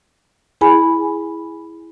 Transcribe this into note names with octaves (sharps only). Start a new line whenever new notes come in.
E4 G#4 G#5 B5